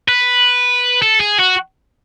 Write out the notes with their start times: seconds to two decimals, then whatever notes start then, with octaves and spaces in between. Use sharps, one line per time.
0.09 B4
1.02 A4
1.20 G#4
1.39 F#4